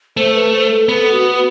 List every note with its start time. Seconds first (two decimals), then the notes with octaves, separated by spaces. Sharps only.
0.17 A3 C5
0.35 B4
0.53 C5
0.71 A4
0.89 B3 A4
1.12 F#4